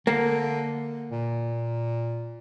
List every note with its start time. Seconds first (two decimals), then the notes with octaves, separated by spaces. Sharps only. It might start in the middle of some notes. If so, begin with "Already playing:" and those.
0.07 D3 A#3
1.11 A#2